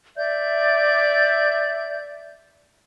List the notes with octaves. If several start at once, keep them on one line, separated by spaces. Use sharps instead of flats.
D5 E5 G6